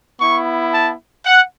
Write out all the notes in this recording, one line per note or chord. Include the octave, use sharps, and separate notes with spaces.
B3 E4 C#6
A5
F#5